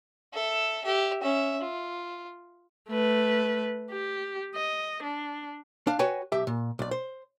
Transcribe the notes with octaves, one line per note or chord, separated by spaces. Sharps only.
A4 E5
G4 E5
C#4 E5
F4
A3 B4
G4
D#5
D4
D4 F5
F#4 B4 C#5 G5 G#5
B1 G4 E5
A#2
B1 D5
C5